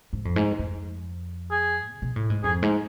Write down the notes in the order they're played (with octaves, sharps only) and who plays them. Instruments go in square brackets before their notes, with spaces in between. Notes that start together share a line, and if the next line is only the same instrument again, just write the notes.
[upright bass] G#2
F2
G#2
F2
[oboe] G#4
[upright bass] C3
B2
A2
G#2
[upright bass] F2 [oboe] G#4
[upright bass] G#2